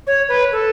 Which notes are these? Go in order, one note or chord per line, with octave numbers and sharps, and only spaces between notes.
C#5
B4
A4